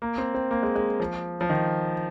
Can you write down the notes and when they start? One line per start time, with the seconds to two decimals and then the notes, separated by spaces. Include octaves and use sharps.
0.02 A#3
0.18 C4
0.34 C4
0.51 A#3
0.63 G#3
0.75 G#3
1.00 F3
1.41 F3
1.50 D#3